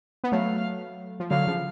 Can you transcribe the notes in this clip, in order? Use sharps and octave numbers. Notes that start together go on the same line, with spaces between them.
B3
F#3 A3 F5
F3
D3 F#3 F5
C#3 F3